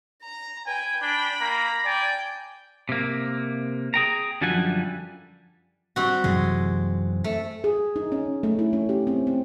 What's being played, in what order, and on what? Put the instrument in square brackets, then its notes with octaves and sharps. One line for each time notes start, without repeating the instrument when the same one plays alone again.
[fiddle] A#5
[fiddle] B4 G5 [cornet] G#5
[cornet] D4 [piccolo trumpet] G5 [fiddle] B5
[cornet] A#3 [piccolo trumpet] A#5
[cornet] D5 [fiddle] G5 [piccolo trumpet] G#5
[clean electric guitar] C3 A#3
G#4 G5 A#5
F#2 D3 F3 G3 F#5 G#5
[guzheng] G3 C4 F#4
[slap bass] F#2 C3 E3 [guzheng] G#3
[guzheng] A3
[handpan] G#4
D#4
C#4
A3
E4
C#4
G4
C4
C4